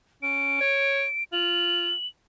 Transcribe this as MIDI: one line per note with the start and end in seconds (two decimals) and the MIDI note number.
0.23 0.59 61
0.23 1.24 98
0.61 1.04 73
1.33 1.92 65
1.33 2.07 102